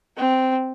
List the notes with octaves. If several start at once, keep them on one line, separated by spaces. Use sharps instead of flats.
C4